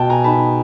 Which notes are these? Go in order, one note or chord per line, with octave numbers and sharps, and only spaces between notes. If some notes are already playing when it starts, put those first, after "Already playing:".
Already playing: B2 G5 A5
G#5 A#5
D#4 A5 B5